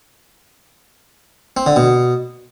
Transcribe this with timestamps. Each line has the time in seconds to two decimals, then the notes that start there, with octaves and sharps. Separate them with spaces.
1.57 C4
1.66 D3
1.76 B2